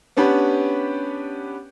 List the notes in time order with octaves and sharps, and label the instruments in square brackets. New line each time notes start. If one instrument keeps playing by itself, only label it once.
[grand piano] B3 C#4 D4 G4 B4